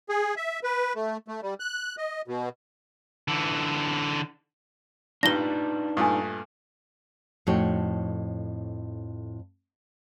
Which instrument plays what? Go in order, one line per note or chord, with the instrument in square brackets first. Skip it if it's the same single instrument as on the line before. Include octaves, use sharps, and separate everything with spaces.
[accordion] G#4
E5
B4
A3
A3
G3
F#6
D#5
B2
[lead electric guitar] D3 E3
[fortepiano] G2 A#2 G3 [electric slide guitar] D4 D#4 B4 [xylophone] A#6 G7
[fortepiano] G2 A#2 A3 [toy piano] G#5 D#6
[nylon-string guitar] F2 A2 D#4 F#4 C#5 G5